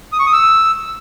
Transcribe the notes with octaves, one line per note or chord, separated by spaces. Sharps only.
D#6
C#6
D#6
E6